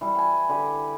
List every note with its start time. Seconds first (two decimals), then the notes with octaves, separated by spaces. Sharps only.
0.01 E3 G3 E4
0.15 G5 G#5
0.49 D3 G4 G#5